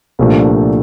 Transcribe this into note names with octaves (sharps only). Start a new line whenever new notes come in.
C2 A#2 F3 A3 D4